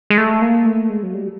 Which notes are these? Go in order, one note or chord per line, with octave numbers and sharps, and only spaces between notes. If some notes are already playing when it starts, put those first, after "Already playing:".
G#3
A3
A#3
A3
G#3
F#3
G3